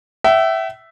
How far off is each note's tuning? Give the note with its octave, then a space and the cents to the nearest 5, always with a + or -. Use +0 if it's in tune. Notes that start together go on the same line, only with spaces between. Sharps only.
E5 +0 G5 -45